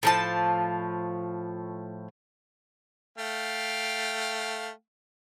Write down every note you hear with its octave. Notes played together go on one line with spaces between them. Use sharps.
A2 F3 A5
A3 F5 G5